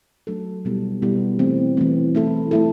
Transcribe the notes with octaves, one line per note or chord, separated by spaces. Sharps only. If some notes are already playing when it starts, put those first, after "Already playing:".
F#3 A3 D4 A4
B2 G3 B3 E4 A4
B2 G3 B3 E4 A4
E3 A3 C4
E3 A3 C4
A3 E4 A4
A3 E4 A4